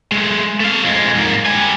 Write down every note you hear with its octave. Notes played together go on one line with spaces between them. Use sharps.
G#3 A3
A3 F5
F2 G#3
G#2 A#3
G3 G#5